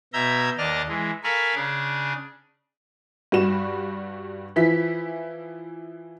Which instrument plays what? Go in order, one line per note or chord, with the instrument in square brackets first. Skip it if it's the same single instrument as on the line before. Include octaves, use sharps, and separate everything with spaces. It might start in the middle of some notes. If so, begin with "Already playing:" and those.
[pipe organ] B2 E5 A#5 G6 G#6
D#2 D4 D5 D#5 A5 F6
E3 G#3
A4 A#4 F5 G#5 B5 C#6
C#3 D4 G#4
[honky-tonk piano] G2 G3 F#4 E7
E3 F3 E4 B6